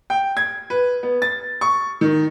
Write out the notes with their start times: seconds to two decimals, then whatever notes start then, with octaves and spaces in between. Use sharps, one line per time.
0.10 G5
0.37 G#6
0.70 B4
1.03 B3
1.22 A6
1.61 C#6
2.01 D#3